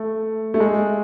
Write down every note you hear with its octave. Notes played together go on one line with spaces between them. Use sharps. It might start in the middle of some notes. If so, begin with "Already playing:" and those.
Already playing: A3
A3
G#3